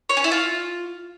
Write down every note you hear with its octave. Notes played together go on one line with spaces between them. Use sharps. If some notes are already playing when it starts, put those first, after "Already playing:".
C#5
C#4
E4
F4